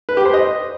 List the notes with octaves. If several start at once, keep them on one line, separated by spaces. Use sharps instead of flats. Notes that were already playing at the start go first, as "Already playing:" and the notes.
B4
G4
C5
D#5